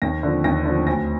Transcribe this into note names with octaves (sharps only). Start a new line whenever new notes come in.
D#2 A#6
D3 F3
D#2 A#6
D3 F3
D2 A#6